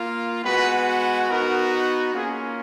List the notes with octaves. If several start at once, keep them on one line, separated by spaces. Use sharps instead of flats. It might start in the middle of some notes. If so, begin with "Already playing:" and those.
Already playing: A#3 F4
G#3 B3 F#4 B4
B3 D#4 F#4 A#4
A#3 C#4 F4 G#4